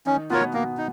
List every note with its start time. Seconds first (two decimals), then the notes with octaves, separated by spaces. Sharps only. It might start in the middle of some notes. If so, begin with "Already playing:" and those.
0.06 D#3 C#4 D#4
0.30 B2 B3 F4 A#4 C#5
0.53 B2 A#3 B3
0.77 D#4